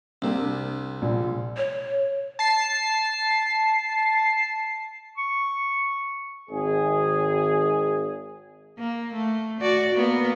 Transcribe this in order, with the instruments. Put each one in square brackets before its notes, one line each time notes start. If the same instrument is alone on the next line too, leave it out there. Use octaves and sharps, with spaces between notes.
[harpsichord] C2 C3 [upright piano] A#3 C4
[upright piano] D4
A#1
[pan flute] C#5
[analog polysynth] A5 C7
[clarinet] C#6
[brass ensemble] G#1 G#4
[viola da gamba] A#3
A3
F#4 D5
A#3 B3